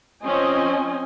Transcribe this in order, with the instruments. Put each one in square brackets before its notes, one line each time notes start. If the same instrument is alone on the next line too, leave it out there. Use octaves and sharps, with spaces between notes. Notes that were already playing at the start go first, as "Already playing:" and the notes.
[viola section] F3 C4 C#4 D#5 G#5